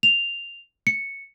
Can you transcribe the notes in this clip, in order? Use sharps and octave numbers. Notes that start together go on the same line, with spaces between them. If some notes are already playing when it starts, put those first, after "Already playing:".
F7
C#7